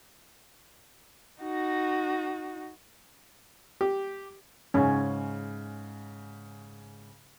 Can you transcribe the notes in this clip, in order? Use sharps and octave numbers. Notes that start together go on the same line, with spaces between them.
D#4 F#4
G4
G#2 C#3 C#4